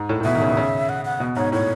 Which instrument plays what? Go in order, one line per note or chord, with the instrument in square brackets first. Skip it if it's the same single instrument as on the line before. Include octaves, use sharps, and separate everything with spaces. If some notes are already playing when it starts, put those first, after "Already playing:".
Already playing: [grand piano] G#2
A2
A2
[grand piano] B2 [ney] E5
[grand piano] D#3
C#3
B2
C#3
[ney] F#5
F#5
[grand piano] B2
[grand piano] G#2 [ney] C#5
[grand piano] A2 [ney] C#5